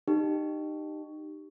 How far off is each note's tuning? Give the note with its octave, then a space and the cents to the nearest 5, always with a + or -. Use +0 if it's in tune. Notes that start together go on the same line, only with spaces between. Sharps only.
D#4 -25 G4 +0